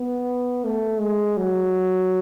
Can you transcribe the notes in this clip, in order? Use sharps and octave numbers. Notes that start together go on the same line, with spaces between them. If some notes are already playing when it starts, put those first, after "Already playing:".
Already playing: B3
A3
G#3
F#3